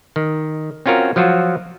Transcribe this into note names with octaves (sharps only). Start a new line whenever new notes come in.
D#3
C4 C#4 F4 F#4 A#4
F3 F#3 F4 F#4